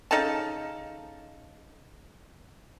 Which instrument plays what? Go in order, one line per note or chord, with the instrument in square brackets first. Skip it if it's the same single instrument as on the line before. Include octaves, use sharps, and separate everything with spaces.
[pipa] C#3 D#4 A4 A5